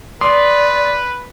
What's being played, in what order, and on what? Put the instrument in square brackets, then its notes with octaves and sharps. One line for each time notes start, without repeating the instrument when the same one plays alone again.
[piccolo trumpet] B4 [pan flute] D5 [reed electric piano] C6 D6 D#6